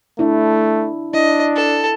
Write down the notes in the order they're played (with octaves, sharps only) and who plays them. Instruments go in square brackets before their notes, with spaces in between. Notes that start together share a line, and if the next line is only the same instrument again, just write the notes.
[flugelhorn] A3 [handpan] D4 E4
[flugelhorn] D4 [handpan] E4 [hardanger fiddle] D#5
[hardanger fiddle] A4